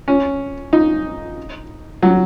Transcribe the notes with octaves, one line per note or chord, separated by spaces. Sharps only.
C#4
D#4
F#3